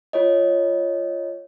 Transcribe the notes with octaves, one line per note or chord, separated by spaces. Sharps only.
F4 C#5 D#5